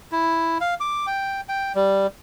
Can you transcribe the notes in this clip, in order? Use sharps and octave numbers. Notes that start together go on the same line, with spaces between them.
E4
F5
D6
G5
G5
G3